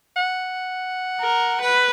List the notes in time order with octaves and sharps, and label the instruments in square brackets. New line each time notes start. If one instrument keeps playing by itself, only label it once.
[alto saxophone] F#5
[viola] A#4
B4